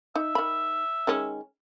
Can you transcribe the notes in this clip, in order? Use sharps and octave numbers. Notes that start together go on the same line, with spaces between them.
D#4 E5
D#3 B5
D#3 G#3 C#4